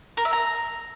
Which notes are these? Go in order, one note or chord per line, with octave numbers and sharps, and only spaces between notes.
A#4
E5
A#5